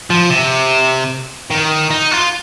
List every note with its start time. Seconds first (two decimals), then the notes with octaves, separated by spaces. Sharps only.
0.10 F3
0.30 C3
1.50 D#3
1.91 D#4
2.11 F4